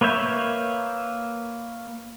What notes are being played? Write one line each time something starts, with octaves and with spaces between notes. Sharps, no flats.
A#3 B4 C#5 E5 G6